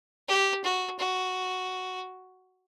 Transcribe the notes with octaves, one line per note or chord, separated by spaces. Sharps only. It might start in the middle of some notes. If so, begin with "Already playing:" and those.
G4
F#4
F#4